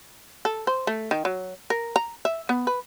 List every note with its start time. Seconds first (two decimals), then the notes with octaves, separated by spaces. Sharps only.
0.45 A4
0.67 C5
0.87 A3
1.11 D#3
1.25 F#3
1.70 A#4
1.96 A#5
2.25 E5
2.49 B3
2.67 B4